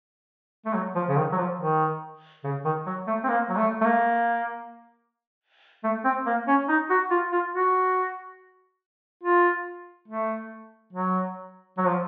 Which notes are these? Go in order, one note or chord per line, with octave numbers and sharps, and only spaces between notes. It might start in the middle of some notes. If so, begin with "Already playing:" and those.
A3
F#3
F3
C#3
D#3
F#3
F3
D#3
C#3
D#3
F#3
A3
C4
A#3
F#3
A3
A3
A#3
A3
C4
A#3
C#4
D#4
F#4
F4
F4
F#4
F4
A3
F#3
F#3
F3